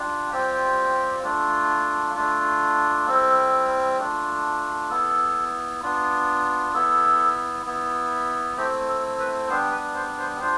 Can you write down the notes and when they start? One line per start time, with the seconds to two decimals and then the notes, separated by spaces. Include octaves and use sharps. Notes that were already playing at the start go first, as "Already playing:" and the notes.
Already playing: G3 D4 F4
0.31 G3 C4 F4 G4
1.23 A3 D4 F4
2.14 A3 D4 F4
3.07 G3 C4 E4 A4
3.98 A3 D4 F4
4.90 B3 E4 A4
5.82 B3 D4 F4
6.74 B3 E4 A4
7.66 B3 E4
8.57 A3 C4 E4 G4
8.88 A4
9.19 B4
9.49 G3 B3 D4 C5
9.72 B4
9.95 C5
10.18 C5
10.40 G3 D4 F4 C5